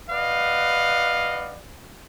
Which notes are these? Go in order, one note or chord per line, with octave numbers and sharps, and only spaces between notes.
B4 D5 D#5 F5 F#5